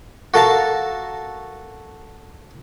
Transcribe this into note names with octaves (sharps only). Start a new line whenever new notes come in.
F#4 A4 A#4 F5 A5